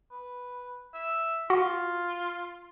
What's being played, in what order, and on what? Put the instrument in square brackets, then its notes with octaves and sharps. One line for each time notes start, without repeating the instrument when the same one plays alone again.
[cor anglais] B4
E5
[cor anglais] F4 [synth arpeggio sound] F#4